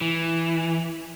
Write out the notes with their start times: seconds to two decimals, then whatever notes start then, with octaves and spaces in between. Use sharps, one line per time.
0.01 E3